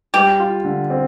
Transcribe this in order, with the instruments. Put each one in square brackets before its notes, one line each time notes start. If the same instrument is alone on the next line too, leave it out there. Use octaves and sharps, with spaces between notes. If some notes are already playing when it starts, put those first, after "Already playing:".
[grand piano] G3 [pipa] G4
[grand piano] F4
D3
C4